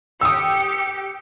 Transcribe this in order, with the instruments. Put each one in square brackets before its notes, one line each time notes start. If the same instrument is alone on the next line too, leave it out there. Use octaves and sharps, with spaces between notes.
[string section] G4 C#7 [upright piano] D#6 E6